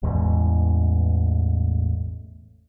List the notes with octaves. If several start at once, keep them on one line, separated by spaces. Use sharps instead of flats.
A1 E2 B2 G#3